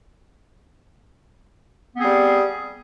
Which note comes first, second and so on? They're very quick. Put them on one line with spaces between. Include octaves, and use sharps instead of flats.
B3 C4 G#4 G3